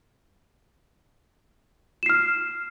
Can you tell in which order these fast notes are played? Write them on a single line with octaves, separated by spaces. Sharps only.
E7 C7 F6